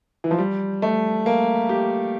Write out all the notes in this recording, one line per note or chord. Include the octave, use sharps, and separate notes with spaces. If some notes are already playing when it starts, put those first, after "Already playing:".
E3
F3
G3
A3
A#3
G4